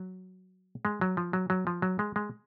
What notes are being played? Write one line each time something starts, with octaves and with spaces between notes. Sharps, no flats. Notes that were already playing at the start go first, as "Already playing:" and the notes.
Already playing: F#3
G#3
F#3
F3
F#3
F#3
F3
F#3
G#3
G#3